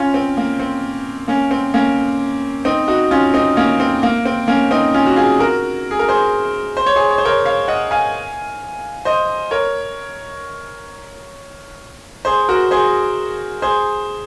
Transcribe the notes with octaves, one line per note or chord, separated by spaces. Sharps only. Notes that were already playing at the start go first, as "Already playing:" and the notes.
Already playing: C#4 F4
C4
A#3
C4
A#3 C#4
C4
A#3 C#4
C4 D#4
D#4 F#4
C#4 F4
C4 D#4
A#3 C#4
C4
A#3
C4
A#3 C#4
C4 D#4
C#4 F4
F#4
F4 G#4
F#4 A#4
G#4
A#4
G#4 C5
C5
C#5
G#4 C5
C#5
C5
A#4 C#5
C#5 F5
D#5 F#5
F5 G#5
C5 D#5
A#4 C#5
G#4 C5
F#4 A#4
G#4 C5
G#4 C5